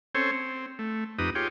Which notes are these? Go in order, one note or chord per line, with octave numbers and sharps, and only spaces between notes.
C4 C#4 A4 C5 C#5
C4
A3
F2 D#4 G4 B4 D#6
F4 G4 G#4 C#5 G5